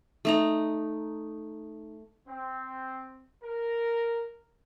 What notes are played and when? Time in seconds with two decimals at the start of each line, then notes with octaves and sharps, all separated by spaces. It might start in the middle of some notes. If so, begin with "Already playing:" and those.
0.25 A3 D#4 A#5
2.28 C4
3.44 A#4